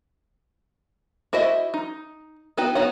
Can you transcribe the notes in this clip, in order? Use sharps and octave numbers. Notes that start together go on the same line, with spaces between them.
E4 F#4 C5 D#5 E5
D#4
B3 D#4 F#4 B4 G5
B3 D#4 F#4 C#5 F#5